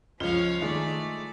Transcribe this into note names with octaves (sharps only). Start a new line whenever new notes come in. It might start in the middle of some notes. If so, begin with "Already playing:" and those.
C#2 F3 F4 C#5 F5
D#3 G#3 A3 D#4 D5